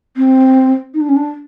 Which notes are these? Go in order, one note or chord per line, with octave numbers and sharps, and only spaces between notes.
C4
D#4
D4
C#4
D4